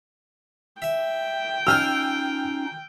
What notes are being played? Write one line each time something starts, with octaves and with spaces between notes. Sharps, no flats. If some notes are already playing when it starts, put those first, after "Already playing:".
E5 G5
C#4 D#4 F4 D#5 G#5 E6 F6 G6